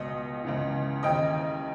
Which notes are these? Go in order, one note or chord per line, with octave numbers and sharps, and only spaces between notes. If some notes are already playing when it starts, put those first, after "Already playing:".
Already playing: C#2 B2 D#5
C#2 C#3 E3
D#2 C#3 E3 D#5 G5